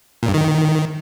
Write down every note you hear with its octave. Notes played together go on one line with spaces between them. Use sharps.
A#2
G2
D#3